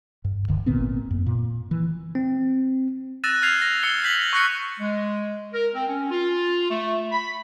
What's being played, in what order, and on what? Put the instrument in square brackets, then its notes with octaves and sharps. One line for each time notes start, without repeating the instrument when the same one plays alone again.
[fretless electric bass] G2
D1 D3
G#1 A#2 B3 C4
F#2
A#2
E3
[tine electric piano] C4
[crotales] E6 F#6 A6 A#6 D#7 E7
F6 G#6 C7 F7
A#6
E6 C#7 F7 G7
G6 B6 F#7
C#6 F6 F#6 A#6 C#7
[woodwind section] G#3
A#4
C4
C#4
F4
A3
B5